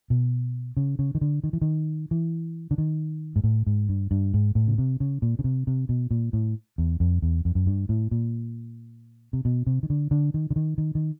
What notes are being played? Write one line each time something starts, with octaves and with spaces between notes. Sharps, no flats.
B2
C#3
C#3
D#3
D3
D#3
E3
D#3
E3
D3
D#3
G#2
A2
G#2
G2
G2
G#2
A2
C#3
C3
C#3
A#2
C#3
C3
C3
B2
A#2
A2
E2
F2
E2
F2
F#2
G2
A2
A#2
C3
B2
C3
D#3
D3
D3
D#3
D3
D#3
D#3
D#3